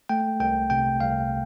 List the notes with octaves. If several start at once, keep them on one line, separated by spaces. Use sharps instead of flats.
A3 G5
C2 G5
C3 G5
C2 F5